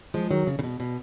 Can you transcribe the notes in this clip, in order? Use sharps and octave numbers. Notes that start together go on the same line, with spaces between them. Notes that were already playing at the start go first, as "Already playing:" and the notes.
F3 G#3
D#3 F#3
C#3
C#3
B2
B2